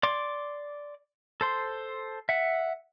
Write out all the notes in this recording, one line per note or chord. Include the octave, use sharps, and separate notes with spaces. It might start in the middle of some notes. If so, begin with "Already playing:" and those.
D5 C6 D6
A4 C5 C6
E5 F#5